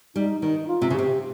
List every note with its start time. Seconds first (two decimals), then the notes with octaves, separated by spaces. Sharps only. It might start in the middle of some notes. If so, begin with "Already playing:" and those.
0.15 G3 D#4
0.41 D#3 D#4
0.68 F4
0.82 C3
0.90 C#3
0.94 C3 G4